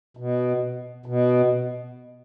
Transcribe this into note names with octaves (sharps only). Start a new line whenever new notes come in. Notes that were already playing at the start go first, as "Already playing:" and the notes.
B2
B2